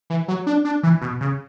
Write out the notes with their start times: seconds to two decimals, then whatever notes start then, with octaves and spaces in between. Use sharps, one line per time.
0.10 E3
0.28 F#3
0.47 D4
0.65 D4
0.83 E3
1.01 B2
1.21 C#3